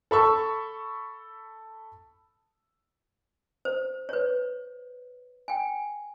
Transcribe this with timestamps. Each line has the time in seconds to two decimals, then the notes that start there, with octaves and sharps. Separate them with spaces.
0.11 A4 B5 C#6 E6
3.65 C5
4.09 B4 C#5
5.48 G5 G#5